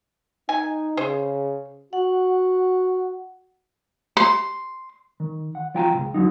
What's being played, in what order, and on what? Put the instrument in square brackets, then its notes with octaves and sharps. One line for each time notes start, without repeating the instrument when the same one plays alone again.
[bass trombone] D#4 [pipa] G#5
[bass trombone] C#3 [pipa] G#4 C5
[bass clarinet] F#4 [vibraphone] F#5
[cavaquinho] C6
[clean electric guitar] D#3
F#5
F3 F4 G5 G#5 A#5
C#2 B2
F2 D3 F#3 D#4